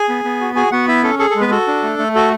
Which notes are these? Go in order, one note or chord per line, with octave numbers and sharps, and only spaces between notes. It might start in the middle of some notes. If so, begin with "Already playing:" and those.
Already playing: G#4 G#5
B3
B3
F#4
F#4 G#4 G#5
B3 F#4 F#5
E4 E5
C#4 A4
G#4 A4
A4
G#3
B3 B4
F#4 A4
D4
A3
A3
F#4 A4